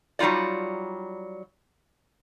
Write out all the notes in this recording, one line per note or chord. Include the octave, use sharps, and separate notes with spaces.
F#3 G3 D#4 F4 D5